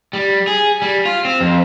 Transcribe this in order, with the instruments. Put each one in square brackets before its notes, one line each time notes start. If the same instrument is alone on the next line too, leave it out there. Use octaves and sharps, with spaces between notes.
[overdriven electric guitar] G3
G#4
G3
F4
C4
F2